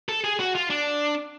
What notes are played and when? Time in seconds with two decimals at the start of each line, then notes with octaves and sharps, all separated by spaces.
0.09 A4
0.24 G#4
0.40 F#4
0.55 F4
0.70 D4